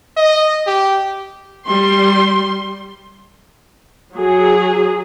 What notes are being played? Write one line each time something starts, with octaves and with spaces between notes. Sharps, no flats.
D#5
G4
G3 C6
F#3 G#4